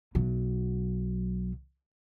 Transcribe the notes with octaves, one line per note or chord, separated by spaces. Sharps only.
B1 F#3